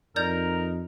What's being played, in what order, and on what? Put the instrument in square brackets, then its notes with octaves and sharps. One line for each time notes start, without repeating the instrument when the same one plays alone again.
[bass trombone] F2 [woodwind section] D#4 [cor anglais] A#4 [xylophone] D5 G6 F7